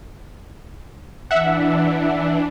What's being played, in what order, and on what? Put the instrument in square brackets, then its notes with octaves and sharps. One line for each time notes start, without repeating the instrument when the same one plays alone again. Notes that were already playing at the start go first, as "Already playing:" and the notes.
[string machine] E3 D4 [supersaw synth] E5 F#5